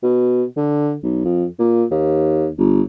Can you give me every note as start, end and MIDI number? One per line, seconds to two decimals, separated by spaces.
0.03 0.44 47
0.57 0.96 50
1.03 1.20 35
1.25 1.46 41
1.59 1.84 46
1.91 2.49 39
2.58 2.82 31